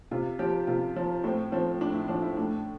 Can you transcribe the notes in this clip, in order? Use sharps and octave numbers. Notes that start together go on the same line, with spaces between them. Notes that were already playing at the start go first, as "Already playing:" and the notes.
C3 F4
F3 G4
C3 F4
F3
A2 C4
F3 C4
A2 D4
E4
F3 D4
E4
A2 D4